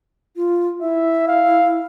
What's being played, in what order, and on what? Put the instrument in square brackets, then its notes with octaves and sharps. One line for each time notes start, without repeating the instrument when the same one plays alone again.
[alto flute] F4
[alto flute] E4 [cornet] E5
[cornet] F5